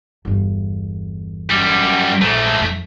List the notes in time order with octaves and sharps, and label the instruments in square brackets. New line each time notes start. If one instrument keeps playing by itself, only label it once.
[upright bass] G1 E2
[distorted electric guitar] F#2 G3
[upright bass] A#1 [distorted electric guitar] G#2 A3
[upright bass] F2